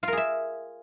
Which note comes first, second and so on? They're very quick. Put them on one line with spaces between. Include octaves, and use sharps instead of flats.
F4 A#4 G#4 E5